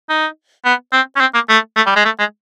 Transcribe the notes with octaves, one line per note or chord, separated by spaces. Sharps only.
D#4
B3
C4
C#4
C4
A#3
A3
A3
G3
G#3
A3
G#3